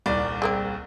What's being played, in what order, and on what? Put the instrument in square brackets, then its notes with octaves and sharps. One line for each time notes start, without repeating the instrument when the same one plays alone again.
[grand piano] D#1 C2 D5
[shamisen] G#3 A#3 C4